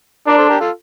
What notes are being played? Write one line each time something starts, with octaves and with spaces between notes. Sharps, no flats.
D4 A#4 D5
A4 C5
G4 A#4
F4 A4